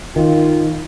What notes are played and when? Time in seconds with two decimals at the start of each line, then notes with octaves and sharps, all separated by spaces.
0.16 D#3 F4